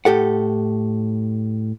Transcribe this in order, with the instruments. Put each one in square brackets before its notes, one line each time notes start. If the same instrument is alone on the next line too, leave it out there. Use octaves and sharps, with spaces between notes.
[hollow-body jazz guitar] A2 G4 A4 F#5